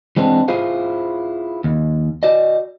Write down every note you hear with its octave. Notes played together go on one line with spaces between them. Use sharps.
E3 G#3 C4 D4
E4 F4 G#4 C5 F5
D#2
F#4 D5 D#5